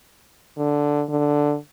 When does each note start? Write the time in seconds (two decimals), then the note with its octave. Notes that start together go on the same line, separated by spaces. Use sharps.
0.58 D3
1.09 D3